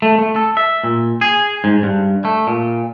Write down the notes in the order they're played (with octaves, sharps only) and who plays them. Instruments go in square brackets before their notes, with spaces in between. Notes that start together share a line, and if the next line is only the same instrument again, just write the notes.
[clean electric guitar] A3
A3
A4
E5
A#2
G#4
G#2
G2
A3
A#2